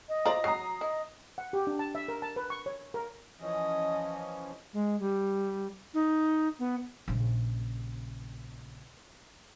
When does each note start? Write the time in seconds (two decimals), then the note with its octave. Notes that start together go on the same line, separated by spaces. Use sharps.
0.09 D#5
0.25 F4 C5 D5 A#5
0.44 F#3 A#5 D#6 C7
0.81 E4 D#5
1.38 F#5
1.53 G4
1.67 D4
1.79 A5
1.95 E5
2.08 A#4
2.22 A5
2.36 B4
2.50 C#6
2.66 C#5
2.94 A#4
3.41 E3 F3 C#4 D#5
4.73 G#3
5.00 G3
5.94 D#4
6.59 B3
7.08 A#1 C#3